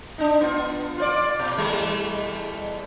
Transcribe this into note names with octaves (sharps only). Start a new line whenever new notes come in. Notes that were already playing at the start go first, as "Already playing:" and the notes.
D4 D#4
B3 F4
F4 C5 D5
B2
E2 G3 A3